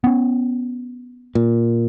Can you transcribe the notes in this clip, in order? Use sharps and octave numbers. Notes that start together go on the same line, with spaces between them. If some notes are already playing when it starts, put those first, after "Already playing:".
B3 C#4
A#2